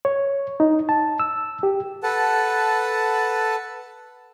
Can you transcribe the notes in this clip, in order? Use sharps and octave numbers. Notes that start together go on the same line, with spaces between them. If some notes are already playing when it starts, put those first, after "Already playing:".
C#5
D#4
A5
E6
G4
A4 B4 F#5 A5